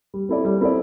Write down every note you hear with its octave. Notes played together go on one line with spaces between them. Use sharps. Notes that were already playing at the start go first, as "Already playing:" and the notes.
G3
C4 E4 A4 D5
G3
C4 E4 A4 D5